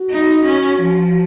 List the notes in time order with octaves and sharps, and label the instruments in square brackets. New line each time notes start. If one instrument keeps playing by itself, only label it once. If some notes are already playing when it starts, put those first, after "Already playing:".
Already playing: [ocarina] F#4
[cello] D#4
C#4
F3